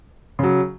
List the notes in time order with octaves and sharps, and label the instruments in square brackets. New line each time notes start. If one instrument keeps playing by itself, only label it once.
[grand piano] C#3 F#3